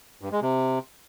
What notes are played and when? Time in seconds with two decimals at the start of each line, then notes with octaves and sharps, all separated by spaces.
0.22 G2
0.32 G#3
0.42 C3